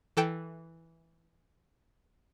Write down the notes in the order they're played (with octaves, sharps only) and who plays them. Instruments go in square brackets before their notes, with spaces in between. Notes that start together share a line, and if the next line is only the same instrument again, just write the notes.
[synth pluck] E3 A4 G5 D7